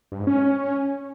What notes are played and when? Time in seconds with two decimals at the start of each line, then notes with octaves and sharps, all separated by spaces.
0.12 G2
0.19 G#2
0.27 C#4